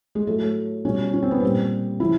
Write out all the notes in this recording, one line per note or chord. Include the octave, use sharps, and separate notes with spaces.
G#3
A2 F#3 A3
B2 G3 C#4
C#4
C4
B3
A#2 G3 C4
C#3 F3 E4